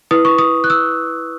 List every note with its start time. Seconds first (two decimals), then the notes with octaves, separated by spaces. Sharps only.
0.11 E4 B4 D#6
0.25 C#6
0.38 D#6
0.64 F#6
0.70 E6